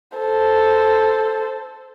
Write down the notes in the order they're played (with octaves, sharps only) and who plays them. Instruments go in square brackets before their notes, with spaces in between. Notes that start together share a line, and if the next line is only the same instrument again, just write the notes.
[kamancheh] A4 C5